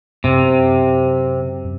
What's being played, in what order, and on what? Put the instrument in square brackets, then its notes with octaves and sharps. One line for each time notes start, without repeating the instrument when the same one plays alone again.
[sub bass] F#2 [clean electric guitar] C3